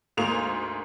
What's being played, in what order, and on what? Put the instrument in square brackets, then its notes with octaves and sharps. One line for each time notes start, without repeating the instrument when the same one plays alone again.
[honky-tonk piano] D2 G#2 A#3 D#6 F7